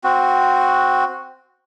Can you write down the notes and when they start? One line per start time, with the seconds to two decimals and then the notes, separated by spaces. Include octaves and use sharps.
0.04 C4 F#4